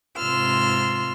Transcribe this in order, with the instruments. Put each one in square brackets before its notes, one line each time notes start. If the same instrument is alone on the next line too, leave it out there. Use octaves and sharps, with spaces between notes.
[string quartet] G#2 C3 F4 C6 E6 F6